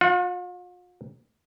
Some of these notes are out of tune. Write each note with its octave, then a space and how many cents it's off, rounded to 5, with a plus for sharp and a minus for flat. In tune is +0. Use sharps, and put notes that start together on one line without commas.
F4 +45 F#5 -15